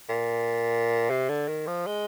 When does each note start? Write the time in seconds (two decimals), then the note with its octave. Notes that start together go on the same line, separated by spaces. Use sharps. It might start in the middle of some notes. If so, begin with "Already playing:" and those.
0.09 A#2
1.10 C3
1.29 D3
1.48 D#3
1.67 F3
1.86 G#3